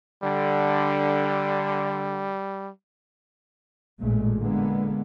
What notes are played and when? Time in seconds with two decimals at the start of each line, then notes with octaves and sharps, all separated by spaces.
0.24 D3 G3
4.01 A1 A#2 G#3 A3
4.40 D3 G#3 A#3 B3